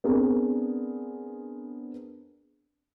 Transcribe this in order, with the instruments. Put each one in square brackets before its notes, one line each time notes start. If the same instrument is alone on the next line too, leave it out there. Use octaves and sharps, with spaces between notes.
[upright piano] B3 C4 D4 G#4 A#4